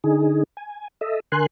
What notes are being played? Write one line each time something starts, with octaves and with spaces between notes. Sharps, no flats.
D3 D#4 G#4
G#5
A4 D#5 E5
D3 A#4 G#5 C6 F#6